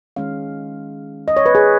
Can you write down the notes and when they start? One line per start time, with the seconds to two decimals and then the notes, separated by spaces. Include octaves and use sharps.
0.16 D#3 G#3 C#4 F5
1.28 D#5
1.37 C#5
1.46 B4
1.55 G#4